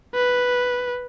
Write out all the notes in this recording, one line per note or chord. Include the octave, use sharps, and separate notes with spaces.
B4